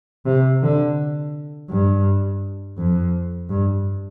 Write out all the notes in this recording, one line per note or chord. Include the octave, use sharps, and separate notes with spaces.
C3
D3
G2
F2
G2